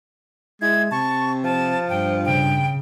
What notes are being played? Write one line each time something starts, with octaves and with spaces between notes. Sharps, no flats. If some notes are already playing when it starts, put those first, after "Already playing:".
G#3 E4 G#6
C3 A5 C#6
F3 A5
G2 G5
C#3 G5